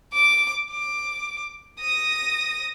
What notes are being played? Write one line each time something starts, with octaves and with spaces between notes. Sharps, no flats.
D6
D6
D#6 A#6